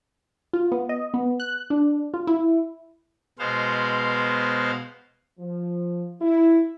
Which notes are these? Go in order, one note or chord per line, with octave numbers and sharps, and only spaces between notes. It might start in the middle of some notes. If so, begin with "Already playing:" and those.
F4
B3
D#5
B3
F#6
D4
F4
E4
B2 G#3 B3 C5 F5
F3
E4